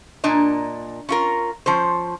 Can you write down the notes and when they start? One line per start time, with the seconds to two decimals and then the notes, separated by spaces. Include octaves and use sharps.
0.24 A#2 A#3 D4 D#5
1.09 C#4 F4 A#4
1.66 F3 C#4 C5